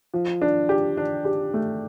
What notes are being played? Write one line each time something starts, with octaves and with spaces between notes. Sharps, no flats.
F3
D4
G4
D4
G4
A3